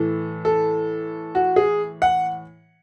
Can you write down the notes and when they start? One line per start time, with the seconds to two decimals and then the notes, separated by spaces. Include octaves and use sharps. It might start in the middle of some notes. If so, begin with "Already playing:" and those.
Already playing: A2 E3 A4
0.45 A4
1.35 F#4
1.56 G#4
2.02 F#5